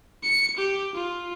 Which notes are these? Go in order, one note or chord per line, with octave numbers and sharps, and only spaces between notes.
C#7
G4
F4